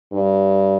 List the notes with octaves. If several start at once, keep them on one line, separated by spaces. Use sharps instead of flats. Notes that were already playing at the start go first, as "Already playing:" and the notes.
G2